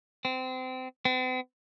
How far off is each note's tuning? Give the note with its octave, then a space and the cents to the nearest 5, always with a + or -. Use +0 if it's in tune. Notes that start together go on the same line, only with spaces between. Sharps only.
C4 -25
C4 -45